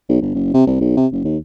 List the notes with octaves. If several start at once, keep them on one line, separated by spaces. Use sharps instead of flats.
B1
G1
F#1
C3
C2
B1
C3
F#1
D#2